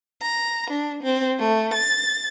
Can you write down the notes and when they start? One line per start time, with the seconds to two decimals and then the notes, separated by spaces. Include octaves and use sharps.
0.22 A#5
0.70 D4
1.03 C4
1.39 A3
1.74 A6